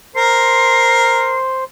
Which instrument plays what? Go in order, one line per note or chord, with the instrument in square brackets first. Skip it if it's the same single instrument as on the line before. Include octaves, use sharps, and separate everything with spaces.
[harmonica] A#4 [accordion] C5 C6 [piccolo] C7